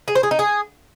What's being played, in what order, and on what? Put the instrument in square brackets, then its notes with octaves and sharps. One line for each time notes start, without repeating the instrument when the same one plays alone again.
[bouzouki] G#4
C5
G#4
D#4
G#4